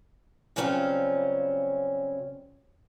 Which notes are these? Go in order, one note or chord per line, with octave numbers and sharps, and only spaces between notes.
C#3 F#3 G3 C4 C#4 F4